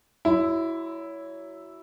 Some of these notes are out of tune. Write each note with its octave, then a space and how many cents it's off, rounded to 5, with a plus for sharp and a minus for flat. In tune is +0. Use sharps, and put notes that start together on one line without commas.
F#3 +20 E4 +0 C6 -40